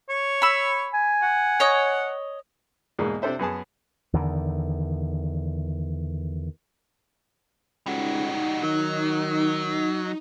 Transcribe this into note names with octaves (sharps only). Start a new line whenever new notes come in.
C#5
B5 E6
G#5
F#5
C#5 D#5
E2 G#2 B2 G#3 A#3
C3 C4 D4 A4 C5 E5
F#2 B3 G#4 A5
E2 D3 D#3
C#2 G3 D#4 F#4
D#3 F#3